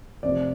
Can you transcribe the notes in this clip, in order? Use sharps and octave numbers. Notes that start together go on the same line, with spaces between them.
F1 F2 C3 F3 D5